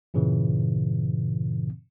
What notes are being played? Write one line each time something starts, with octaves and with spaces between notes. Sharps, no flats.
G2 A#2 C#3 E3